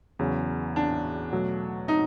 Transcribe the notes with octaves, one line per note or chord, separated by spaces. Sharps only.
E2 C#3 F#3
D4
B2 F#3 A3
D#4